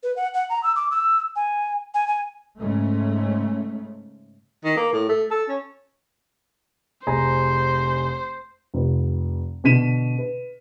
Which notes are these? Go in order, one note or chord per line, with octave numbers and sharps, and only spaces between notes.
B4
F#5
F#5
A#5
E6
D6
E6
G#5
G#5
G#5
G#2 C#3 A3
D#3
A#3
A2
A3
A4
C#4
F1 G#4 C5 A#5
F1
B2 D3 B6 D#7 E7
B4